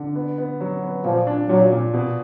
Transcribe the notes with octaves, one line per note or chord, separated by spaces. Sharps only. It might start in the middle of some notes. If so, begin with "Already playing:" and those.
Already playing: D3
B3
B3
F#3
B3
A#2 F3
D4
A#2 F#3
A#2
B2